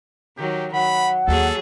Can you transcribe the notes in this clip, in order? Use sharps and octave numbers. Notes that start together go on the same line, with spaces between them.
D#3 F#3 G4
F#3 F#5 B5
D#2 F#3 G#4 A4